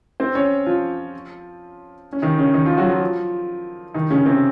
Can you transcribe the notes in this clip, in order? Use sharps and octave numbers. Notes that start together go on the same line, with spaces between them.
C4 C5
C#4 C#5
F3 F4
C#4
D#3 D#4
C#3 C#4
D#3 D#4
F3 F4
F#3 F#4
F3 F4
D#3 D#4
C#3 C#4
C3 C4